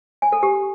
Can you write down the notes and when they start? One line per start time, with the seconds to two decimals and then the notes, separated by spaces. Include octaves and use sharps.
0.22 G#5
0.32 A4
0.43 G4